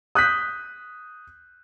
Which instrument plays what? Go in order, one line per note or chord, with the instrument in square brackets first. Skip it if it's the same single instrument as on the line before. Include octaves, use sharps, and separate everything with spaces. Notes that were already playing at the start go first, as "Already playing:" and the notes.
[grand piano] D#6 F#6 G6 B6